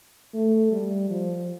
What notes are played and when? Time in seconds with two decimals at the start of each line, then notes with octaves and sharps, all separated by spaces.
0.34 A3
0.72 G3
1.10 F3